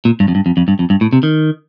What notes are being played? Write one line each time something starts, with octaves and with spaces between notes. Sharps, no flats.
A#2
G2
F2
G2
F2
F2
G2
F2
G2
A2
C3
D#3